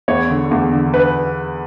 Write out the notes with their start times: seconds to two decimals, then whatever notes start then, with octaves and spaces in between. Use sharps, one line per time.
0.08 E2 C#5
0.30 D3
0.51 E2
0.73 D3
0.94 B4